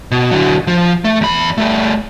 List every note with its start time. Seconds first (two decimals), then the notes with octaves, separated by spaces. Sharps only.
0.11 B2
0.31 D3 F#3
0.67 F3
1.04 A3
1.21 E2 B5
1.58 G3 A3